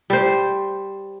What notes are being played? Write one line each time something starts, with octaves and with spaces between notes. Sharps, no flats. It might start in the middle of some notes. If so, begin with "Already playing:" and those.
G3 C5